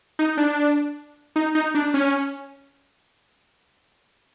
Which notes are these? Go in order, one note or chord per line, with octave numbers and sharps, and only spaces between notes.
D#4
D4
D#4
D#4
D4
C#4